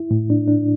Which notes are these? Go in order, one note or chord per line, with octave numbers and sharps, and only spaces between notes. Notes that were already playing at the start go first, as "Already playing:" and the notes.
Already playing: E4
A2
D4
D4